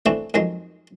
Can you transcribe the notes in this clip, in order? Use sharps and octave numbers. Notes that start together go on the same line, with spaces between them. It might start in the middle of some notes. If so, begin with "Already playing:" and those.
E3 A3 C4 D4 F#4
F2 D#3 F#3 G#3